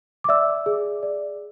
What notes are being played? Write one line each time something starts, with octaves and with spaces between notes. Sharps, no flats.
D6
D5 E5 E6
G#4
D5